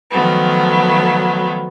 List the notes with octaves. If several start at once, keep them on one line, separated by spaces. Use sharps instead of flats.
D#3 F3 F#3 A3 B3